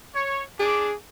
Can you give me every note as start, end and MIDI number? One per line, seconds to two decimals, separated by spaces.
0.15 0.43 73
0.60 0.91 62
0.60 0.93 68
0.60 0.91 86